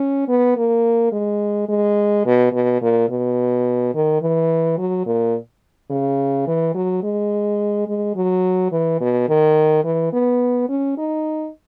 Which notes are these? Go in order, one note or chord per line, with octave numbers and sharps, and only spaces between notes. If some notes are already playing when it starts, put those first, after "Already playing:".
Already playing: C#4
B3
A#3
G#3
G#3
B2
B2
A#2
B2
D#3
E3
F#3
A#2
C#3
E3
F#3
G#3
G#3
F#3
E3
B2
D#3
E3
B3
C#4
D#4